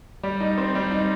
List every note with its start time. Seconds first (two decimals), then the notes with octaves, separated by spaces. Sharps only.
0.23 G3
0.40 D#4
0.58 C4
0.75 G3
0.91 D#4